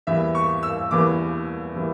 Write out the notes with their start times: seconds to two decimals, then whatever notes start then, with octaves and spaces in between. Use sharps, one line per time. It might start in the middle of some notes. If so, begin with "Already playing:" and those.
0.07 E2 E3 G3 A#3 E5
0.35 C#6
0.63 E6
0.91 E2 E3 G3 A#3 D6
1.75 E3 G3 A#3